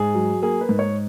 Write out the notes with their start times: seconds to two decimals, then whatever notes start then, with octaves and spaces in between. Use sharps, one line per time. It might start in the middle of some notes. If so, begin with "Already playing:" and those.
Already playing: G#2 G#4
0.15 F#3
0.42 A#3 G#4
0.61 B4
0.69 G#2
0.79 C#5